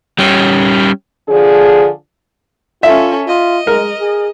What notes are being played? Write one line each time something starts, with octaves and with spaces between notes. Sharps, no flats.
G3 C#4
D3 F3 D4 G#4
C#4 F4 A4 E5
F4 D#5
G#3 A#4
G#4